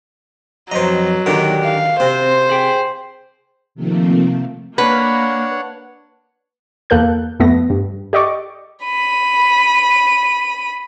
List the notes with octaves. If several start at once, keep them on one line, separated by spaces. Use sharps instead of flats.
F2 F#3 B4 C5 D#5 A#5
D3 D#3 D4 G4 A#4
F5
C3 C4 C5
G#4 G5
C3 D#3 F3 A3 A#3 C4
A#3 D4 B4 C#5 F#5
E2 A#3 A4 A#4 F#6 G6
F2 A3 B3 A#6
G2
G4 D5 D#5 C#6 D6
B5 D#7